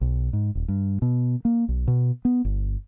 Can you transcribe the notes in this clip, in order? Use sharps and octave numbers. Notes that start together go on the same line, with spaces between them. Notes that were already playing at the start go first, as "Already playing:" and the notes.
B1
G#2
D#1
G2
B2
A#3
B1
B2
B3
G1